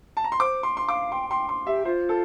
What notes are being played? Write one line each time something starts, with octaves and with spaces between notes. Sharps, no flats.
A5
A#5
C6
C5 D6
C6
C6
F5 D6
G5 C6
G5 C6
C6
G4 E5
F4 C5
A4